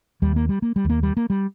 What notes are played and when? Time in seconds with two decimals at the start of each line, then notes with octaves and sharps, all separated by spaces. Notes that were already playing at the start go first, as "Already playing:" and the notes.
0.22 D#2 G3
0.36 A#3
0.49 G3
0.62 A#3
0.76 G3
0.85 D#2
0.90 A#3
1.03 G3
1.17 A#3
1.30 G3